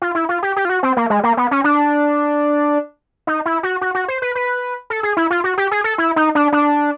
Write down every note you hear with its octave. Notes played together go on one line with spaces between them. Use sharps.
F4
E4
F4
G4
G4
F4
F#4
C4
A#3
G#3
A#3
B3
C#4
D4
D#4
E4
F#4
F#4
F#4
C5
B4
B4
A4
G#4
E4
F4
F#4
G4
G#4
A4
E4
D#4
D4
D4